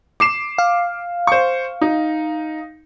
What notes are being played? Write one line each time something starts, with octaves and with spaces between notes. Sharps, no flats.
D6 C7 E7
F5
C5 C#6
D#4